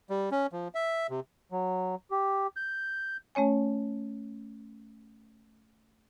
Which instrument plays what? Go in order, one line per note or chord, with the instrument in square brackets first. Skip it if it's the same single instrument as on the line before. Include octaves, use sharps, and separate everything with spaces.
[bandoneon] G3
C#4
F3
E5
C3
[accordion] F#3
G4
G6
[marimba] A3 C#4 C#5 G#5